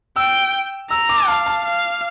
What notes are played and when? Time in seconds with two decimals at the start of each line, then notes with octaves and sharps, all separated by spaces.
0.16 G5 E6
0.91 A#5 E6
1.09 D6
1.28 F5 A5
1.46 A5
1.65 F5